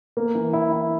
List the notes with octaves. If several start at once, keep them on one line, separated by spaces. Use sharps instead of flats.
A#3
E3
E4
E4